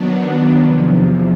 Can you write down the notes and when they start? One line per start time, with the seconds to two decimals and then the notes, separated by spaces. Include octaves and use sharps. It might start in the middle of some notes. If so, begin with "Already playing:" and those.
Already playing: D#3 F#3 B3 D4
0.60 E2 C3 F3